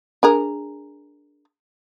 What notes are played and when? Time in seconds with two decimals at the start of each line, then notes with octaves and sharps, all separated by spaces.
0.23 D4 G#4 A#4